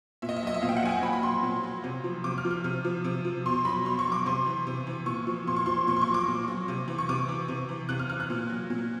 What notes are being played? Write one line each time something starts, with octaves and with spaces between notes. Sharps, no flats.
A#2 E5
D#5
E5
F#3 D#5
E5
A#2 F5
G5
F#5
F#3 G#5
G5
A#2 B5
B5
F#3 C6
A#2
F#3
C3
F3
C3 D6
F6
F3
F6
C3
F3
C3
F3
B2 C6
F#3 B5
B2 C6
C#6
F#3
D6
C3 C6
E3
C3
E3
A#2 C#6
F3
A#2 C6
C#6
F3 C6
A#2 C#6
C6
C#6
F#3
D6
A#2
F#3
C3
E3
C#6
C3 D6
E3
C3
E3
C3 F#6
F6
E3 F6
F#6
A#2
F#3
A#2